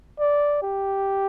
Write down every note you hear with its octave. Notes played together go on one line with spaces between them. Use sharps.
D5
G4